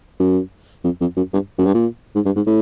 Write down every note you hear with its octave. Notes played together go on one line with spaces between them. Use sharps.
F#2
F2
F2
F#2
G2
F#2
G2
A#2
G#2
G2
G#2
A2